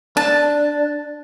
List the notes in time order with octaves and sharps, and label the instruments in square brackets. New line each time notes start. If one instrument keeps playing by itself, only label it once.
[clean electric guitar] D4 [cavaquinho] A5